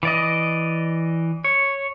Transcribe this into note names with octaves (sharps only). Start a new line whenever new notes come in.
E3 D5 D#5
C#5